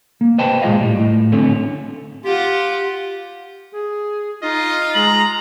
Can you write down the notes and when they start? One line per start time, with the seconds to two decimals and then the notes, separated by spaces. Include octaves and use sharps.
0.21 A#3
0.38 B4 C5 D#5 G5 A5 B5
0.62 A#2 G#3 F4 D#5 F5
0.81 A2 G3
0.99 A2
1.32 D3 A3 C4 C#4
2.25 F4 G4 F#5
3.72 G#4
4.43 D#4 F4 D#5
4.95 G#3 A#5 F#7